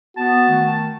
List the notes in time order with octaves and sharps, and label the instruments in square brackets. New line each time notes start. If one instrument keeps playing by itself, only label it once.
[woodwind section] B3 [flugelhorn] F#4 [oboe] A5
[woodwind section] D#3 A3